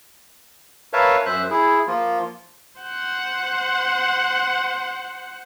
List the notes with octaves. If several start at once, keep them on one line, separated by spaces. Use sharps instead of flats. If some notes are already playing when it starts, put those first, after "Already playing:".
A#4 B4 C#5 E5 F5 A5
F#2 C5 E5 F#6
E4 G#4
F3 A#3 F4
C5 F#5